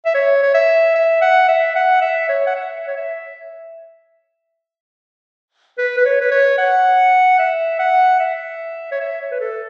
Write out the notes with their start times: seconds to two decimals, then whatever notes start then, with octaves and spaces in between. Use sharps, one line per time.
0.06 E5
0.15 C#5
0.43 C#5
0.54 E5
0.95 E5
1.22 F#5
1.48 E5
1.75 F#5
2.02 E5
2.29 C#5
2.47 F#5
2.56 E5
2.87 C#5
2.96 E5
5.78 B4
5.97 B4
6.05 C#5
6.21 B4
6.31 C#5
6.58 F#5
7.39 E5
7.79 F#5
8.20 E5
8.92 C#5
9.00 E5
9.21 C#5
9.32 B4
9.41 A4